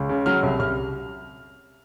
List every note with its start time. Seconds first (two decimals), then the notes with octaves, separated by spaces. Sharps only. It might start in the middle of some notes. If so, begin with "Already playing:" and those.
Already playing: C#2
0.09 C#3
0.26 F#3 F6
0.43 C2
0.60 C2 F6